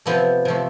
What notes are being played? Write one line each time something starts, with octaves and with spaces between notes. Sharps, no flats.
C3 F3 A3 B3
C3 F3 A3